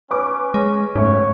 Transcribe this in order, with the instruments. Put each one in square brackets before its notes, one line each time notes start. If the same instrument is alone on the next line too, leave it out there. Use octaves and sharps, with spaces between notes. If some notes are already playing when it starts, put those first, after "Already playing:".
[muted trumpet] C#4 [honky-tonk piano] B4 D6
[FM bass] G#3 [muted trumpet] C#4
[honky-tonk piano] F#1 A3 C#6 [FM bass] G#2 [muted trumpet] C#5